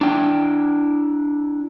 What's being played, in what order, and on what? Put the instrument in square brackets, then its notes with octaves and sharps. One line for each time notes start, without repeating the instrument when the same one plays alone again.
[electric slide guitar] D4 E4 G5